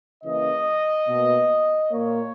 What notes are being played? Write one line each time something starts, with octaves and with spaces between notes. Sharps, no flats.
C#3 E3 A#3 D#5
B2 A#3
A#2 A#3 C#5